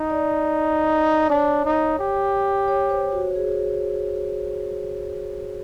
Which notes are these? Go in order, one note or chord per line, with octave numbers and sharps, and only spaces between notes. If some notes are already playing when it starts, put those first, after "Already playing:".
Already playing: D#4
D5
D4 C#5
D#4
G4
C#5
C5
F#4
G#4